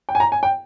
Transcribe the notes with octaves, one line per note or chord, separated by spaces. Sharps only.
G5
G#5
A#5
G#5
G5